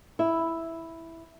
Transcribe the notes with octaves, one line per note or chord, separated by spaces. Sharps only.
E4